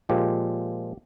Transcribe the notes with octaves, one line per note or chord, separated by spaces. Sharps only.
A#2 F3 G#3 G4